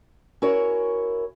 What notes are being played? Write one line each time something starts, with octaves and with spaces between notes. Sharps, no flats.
C#4 E4 F#4 A#4 C#5